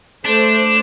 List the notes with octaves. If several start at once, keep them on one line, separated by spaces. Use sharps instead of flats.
A3 D4 C5